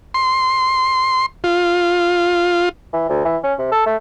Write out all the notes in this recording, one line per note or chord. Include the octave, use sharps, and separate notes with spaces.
C6
F4
E3
D2
E3
C#4
C3
A4
A3